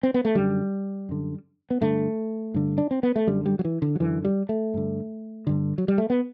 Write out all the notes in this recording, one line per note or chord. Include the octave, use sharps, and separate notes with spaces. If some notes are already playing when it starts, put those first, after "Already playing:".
C4
B3
A3
F#2 D3 G3
F#2 D3
B3
G2 D3 A3
G2 D3
D4
C4
B3
A3
F#2 D3 G3
G3
F#3
E3
D3
F#3
F#2 D3 E3
G3
A3
G2 D3
G2 D3
F#3
G3
A3
B3